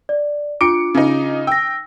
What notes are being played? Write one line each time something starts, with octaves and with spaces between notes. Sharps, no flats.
D5
D4 F4 D6 C#7 D7
C#3 D#4
G5 E6 A#6